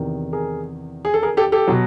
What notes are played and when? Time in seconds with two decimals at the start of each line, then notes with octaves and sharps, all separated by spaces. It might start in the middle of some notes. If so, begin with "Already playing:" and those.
Already playing: E2 C3 D#3
0.33 G#4 A#4
1.05 G#4
1.14 A4
1.22 G#4 A#4
1.37 G4 A4
1.52 G4 A4
1.67 B2 F#3